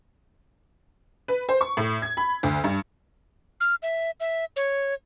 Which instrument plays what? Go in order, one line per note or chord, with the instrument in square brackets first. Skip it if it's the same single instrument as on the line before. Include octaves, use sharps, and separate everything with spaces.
[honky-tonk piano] B4
C5
C#6
A2
G#6
B5
D2
G2
[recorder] F6
E5
E5
C#5